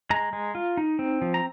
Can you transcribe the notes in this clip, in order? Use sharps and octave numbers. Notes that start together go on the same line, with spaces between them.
G#3 A#5
G#3
F4
D#4
C4
F3
A#5